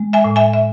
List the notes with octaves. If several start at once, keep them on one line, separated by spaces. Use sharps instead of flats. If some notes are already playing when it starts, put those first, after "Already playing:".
Already playing: G#3
E5 G#5
A2
E5 G#5
E5